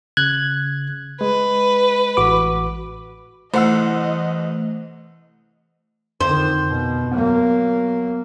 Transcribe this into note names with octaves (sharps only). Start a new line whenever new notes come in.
C#3 F#6 G#6
G#3 B4
A1 F#4 D6
C2 E3 A3 C5 D#5 F#5 E6
F2 D3 D#3 C5
B2
F#3 A#3 B3